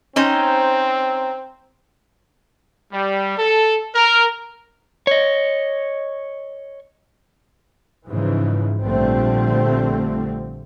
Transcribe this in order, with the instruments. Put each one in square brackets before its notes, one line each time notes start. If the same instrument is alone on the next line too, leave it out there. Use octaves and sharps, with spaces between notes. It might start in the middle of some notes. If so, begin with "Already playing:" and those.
[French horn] C4 [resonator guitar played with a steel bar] C#4 D#4 C5
[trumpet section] G3
A4
A#4
[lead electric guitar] C#5 D#5
[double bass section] G#2 C#3 E3 F3
A#1 D3 F3 G3 A3 C4